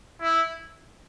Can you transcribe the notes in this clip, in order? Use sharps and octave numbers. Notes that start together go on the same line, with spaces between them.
E4